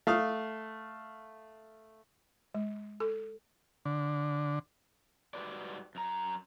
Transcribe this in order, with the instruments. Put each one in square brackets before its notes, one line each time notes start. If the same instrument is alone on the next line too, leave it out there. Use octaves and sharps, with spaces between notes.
[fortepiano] A3 F5 D#6 F6
[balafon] G#3
A4
[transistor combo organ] D3
[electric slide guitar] G#2 G3 D4 F#4 B4 D5
F#2 A#5